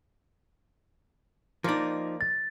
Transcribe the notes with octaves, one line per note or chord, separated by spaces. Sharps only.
F3 A#3 D#4 D5
A6